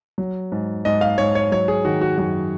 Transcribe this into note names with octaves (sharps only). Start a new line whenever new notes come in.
F#3
G#2
G#2 D#5
F5
G#2 C#5
C#5
F#3 C#5
G#4
D#3 F#4
F#4
F#2 F#4